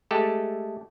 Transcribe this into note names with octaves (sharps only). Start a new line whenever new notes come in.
G#3 A3 G4 A4